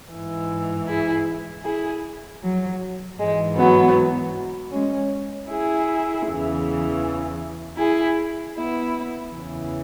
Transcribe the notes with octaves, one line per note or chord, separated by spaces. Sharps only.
G#2 E3
E4 G#4
E4 G#4
F#3
G#2 E3 G#3
F#3 B3
G#3 C#4
E4 G#4
E2 C#3 E3
E4 G#4
B3 E4
E2 C#3 E3